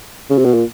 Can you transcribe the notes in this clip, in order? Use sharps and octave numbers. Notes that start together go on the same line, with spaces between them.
C#3
C3
B2
A#2